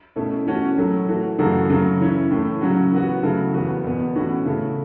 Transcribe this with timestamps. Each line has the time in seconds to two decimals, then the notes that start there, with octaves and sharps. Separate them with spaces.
0.16 B2 A3 C#4 E4
0.47 E3 A3 C#4 F#4
0.78 A2 F#3 A3
1.08 E3 A3 F#4
1.38 F#2 C#3 E3 A3 F#4
1.69 C#3 F#3 A3 F#4
2.01 E3 C#4 E4
2.31 A2 E3 A3
2.61 C#3 F#3 C#4 F#4
2.92 E3 B3 F#4
3.23 C#3 F#3 A3 E4
3.54 E2 E3 B3 F#4
3.84 E2 B2 B3
4.15 A2 E3 C#4 F#4
4.46 C#3 A3 E4